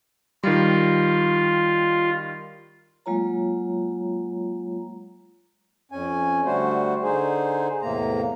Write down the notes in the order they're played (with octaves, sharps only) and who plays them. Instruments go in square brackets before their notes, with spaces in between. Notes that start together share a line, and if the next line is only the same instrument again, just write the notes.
[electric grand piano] D#3 G3 [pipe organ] F4
[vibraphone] F#3 G#3 A#3 F4 C#5 A#5
[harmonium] F2 C#4 G#5
D3 G3 A3 F#4 C5
D3 D#4 G#4 C5
E2 A2 C3 A#3 A#5